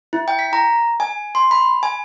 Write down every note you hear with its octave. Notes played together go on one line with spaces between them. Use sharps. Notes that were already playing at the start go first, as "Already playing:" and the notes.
E4
G5
B6
A#5
G#5
C6
B5
G#5